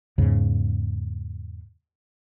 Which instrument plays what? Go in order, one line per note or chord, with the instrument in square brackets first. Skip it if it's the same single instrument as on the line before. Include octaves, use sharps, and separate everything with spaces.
[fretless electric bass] E2 G#2 C#3